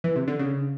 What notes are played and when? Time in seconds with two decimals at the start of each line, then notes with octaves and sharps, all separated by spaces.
0.04 E3
0.16 C3
0.28 D3
0.39 C#3